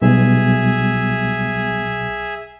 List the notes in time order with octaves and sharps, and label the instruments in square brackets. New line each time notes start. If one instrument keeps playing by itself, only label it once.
[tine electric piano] B1 [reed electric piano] B2 G3 B3 [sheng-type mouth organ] G#4 E5